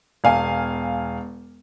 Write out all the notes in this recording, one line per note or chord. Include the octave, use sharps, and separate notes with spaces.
E1 F5 G#5